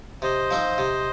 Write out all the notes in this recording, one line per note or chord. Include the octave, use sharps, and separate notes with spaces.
C3 C5 D#5
F3 C4 D#4
C3